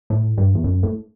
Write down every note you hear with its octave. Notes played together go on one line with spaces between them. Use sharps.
A2
G2
E2
F#2
A2